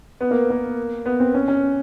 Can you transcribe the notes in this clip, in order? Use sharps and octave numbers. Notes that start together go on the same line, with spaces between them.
B3
A#3
A#3
B3
C4
C#4
C#4